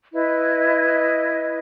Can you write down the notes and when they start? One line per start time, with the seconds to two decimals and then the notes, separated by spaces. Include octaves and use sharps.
0.13 E4 B4 D#5